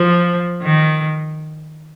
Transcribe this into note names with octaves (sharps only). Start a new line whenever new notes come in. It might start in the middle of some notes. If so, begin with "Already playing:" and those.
Already playing: F3
D#3